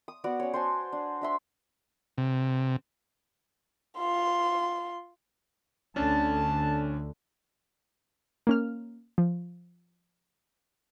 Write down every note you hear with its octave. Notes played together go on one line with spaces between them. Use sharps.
D#6
B3 F#4 D5 C#6
C#4 C#5
C5 G#5 A5
D4
D4 E5 C6
C3
F4 C6
D2 D3 C#4 D4 A5
A#3 C#4 F6
F3